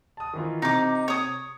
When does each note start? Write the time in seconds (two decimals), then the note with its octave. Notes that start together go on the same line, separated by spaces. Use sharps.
0.17 A5 D#6
0.33 D#3 E3 F4
0.62 C3 D#4 D6
1.08 C#5 D#6